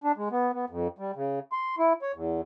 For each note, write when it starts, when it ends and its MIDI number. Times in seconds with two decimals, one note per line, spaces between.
0.04 0.12 62
0.17 0.29 56
0.31 0.52 59
0.53 0.65 59
0.70 0.88 41
0.99 1.12 55
1.15 1.39 49
1.52 1.75 84
1.79 1.93 64
2.02 2.12 73
2.15 2.41 40